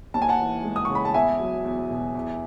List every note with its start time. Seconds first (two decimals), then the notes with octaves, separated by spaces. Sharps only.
0.14 D#2 A5
0.22 G#5
0.29 F#5 A5
0.40 E3
0.64 G#3
0.76 D#6
0.85 C#3 C#6
0.95 B5
1.05 A5
1.14 E2 E5 G#5
1.40 F#3
1.65 E2
1.90 B2
2.15 E2